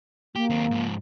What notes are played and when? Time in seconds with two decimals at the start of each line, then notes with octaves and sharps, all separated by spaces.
0.36 A#3 G4
0.50 D#2 C4
0.71 G#2 F3